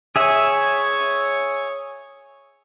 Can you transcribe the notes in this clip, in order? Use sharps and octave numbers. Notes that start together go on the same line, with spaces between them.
G#4 C#5 E5 G#5